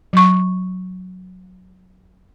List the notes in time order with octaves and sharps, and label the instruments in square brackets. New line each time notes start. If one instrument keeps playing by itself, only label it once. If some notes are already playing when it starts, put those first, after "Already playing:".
[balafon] F#3 C#6